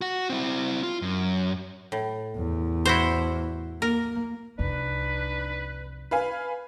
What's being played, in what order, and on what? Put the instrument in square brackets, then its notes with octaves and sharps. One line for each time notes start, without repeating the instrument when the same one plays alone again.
[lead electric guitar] F#4 F#5
C4 E4
F4
F#2
[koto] A2
[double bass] E2
[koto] E4 F#4 C5
[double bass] A#3 [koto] A#4
[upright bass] C2 F2 [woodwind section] D4 D#4 B4
[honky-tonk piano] B4 F5 G#5